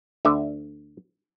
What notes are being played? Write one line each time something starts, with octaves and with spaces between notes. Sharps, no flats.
D2 D3 E5